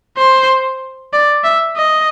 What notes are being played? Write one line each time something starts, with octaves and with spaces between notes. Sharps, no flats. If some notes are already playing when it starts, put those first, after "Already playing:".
C5
D5
E5
D#5